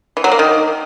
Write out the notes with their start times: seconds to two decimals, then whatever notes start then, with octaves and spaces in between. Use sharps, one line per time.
0.17 E3
0.24 F#3
0.32 A#3
0.39 D#3